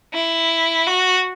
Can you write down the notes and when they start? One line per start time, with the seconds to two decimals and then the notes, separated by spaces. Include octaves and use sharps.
0.14 E4
0.86 F#4